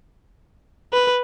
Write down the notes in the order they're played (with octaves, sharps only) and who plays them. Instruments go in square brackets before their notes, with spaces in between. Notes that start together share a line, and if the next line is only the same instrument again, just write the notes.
[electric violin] B4